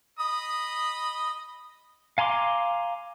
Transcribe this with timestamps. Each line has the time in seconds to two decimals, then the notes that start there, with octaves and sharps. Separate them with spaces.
0.19 D#5 B5 D#6
2.18 F5 G#5 A#5 C6 D6